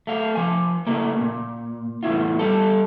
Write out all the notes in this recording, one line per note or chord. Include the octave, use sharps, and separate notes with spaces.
A3 F5
F3 G#5
C#3 A3 A#3
A#2
E2 A2 E4 F4
G3 A4